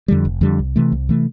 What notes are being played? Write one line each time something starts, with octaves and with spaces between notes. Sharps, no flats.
F2 D3 G3
F1
F2 D3 G3
C2
C3 E3 A3
C2
C3 E3 A3